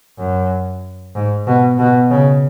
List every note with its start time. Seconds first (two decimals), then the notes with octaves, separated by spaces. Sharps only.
0.18 F#2
1.15 G#2
1.47 B2
1.78 B2
2.10 C#3